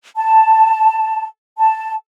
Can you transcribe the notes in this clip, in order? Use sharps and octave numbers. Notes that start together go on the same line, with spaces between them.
A5
A5